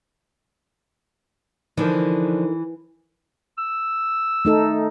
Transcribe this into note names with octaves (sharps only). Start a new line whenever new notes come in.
D3 E3 F3 D#4 A#4
E6
A3 D#4 A4